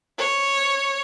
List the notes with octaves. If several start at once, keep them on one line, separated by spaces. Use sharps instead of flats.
C#5